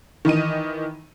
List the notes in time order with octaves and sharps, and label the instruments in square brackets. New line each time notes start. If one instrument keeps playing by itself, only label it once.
[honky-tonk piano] D#3 E3 D#5 D#7